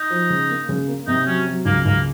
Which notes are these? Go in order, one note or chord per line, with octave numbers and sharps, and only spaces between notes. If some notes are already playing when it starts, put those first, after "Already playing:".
Already playing: D#4
F3
C#3
A#3
C#3
A#3
C3 D#4
F#3 C#4
F#3
C#2 A#3
C#2 A#3